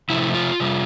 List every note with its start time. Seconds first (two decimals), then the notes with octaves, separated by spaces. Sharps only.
0.09 C3 F3 A3 E4
0.34 F4
0.60 C3 G3